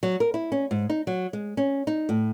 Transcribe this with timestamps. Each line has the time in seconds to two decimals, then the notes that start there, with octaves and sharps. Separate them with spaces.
0.03 F#3
0.20 A#4
0.34 E4
0.52 C#4
0.71 G#2
0.90 D#4
1.07 F#3
1.33 G#3
1.57 C#4
1.87 D#4
2.09 A2